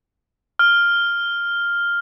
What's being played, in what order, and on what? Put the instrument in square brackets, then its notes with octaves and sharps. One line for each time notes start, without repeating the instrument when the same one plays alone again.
[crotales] F6